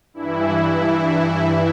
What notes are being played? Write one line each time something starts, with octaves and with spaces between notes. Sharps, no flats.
G2 E3 E4